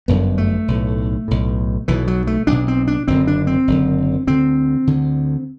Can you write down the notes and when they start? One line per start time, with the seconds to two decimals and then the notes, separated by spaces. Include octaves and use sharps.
0.08 G1 F#2 D3 B3
0.38 A3
0.68 B1 A2
1.28 B1 A2
1.88 B1 B2 E3
2.08 F#3
2.27 A3
2.47 B1 B2 D4
2.68 C4
2.88 D4
3.08 F#1 F#2 D3 C4
3.27 D4
3.47 C4
3.68 F#1 F#2 D3
4.27 D2 D3 C4
4.87 D2 D3